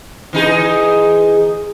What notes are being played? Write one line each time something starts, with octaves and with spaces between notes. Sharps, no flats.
E3 D#4 G#4